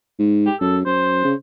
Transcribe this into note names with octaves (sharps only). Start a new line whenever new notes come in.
G#2
G4
F#2 A4
F#2 C5
C#3